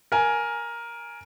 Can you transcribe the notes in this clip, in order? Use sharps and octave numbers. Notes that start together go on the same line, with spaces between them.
A#4 G#5